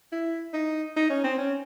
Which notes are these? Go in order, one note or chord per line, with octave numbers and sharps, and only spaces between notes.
E4
D#4
D#4
C#4
C4
C#4